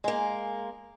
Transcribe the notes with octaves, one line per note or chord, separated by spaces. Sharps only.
G#3 A#3